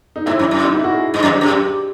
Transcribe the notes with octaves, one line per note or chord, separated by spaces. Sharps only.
D#4
G#2 E4
F#2
F#2
D#4
E4
F#4
G#4
G2
F#2
F#2 G4